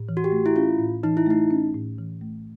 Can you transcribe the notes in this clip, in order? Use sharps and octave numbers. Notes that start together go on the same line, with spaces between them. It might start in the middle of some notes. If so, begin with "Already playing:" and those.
Already playing: A2
E3
F#4
G4
A3
E4
C#4 F4
A2
E3 D#4
E4
A3 D#4
C#4
A2
E3
A3